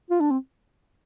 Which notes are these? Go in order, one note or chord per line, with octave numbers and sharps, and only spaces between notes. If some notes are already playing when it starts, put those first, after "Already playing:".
F4
D4
C4